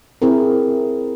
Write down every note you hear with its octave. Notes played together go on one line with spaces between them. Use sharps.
C4 E4 G#4 A#4